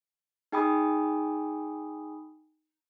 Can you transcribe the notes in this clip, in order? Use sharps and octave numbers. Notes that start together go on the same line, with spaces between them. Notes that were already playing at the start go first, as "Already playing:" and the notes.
D#4 G#4 G5 G#5 B5 D#6